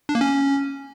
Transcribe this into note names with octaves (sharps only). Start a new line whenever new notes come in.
D4
A#3
C#4